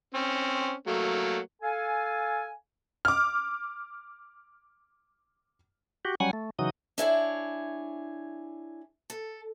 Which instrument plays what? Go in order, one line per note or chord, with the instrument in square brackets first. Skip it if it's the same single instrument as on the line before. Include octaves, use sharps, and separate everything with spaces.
[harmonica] C4 C#4
F#3 A3 A#3
[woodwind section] A4 F5 G#5
[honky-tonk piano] D6 F6
[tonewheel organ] F#4 G4
F#3 G3 C#4 F#5 G#5
A3
C#3 E3 F#3 D#4 F#4 D#6
[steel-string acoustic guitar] D4 E4 G#4 C#5
A4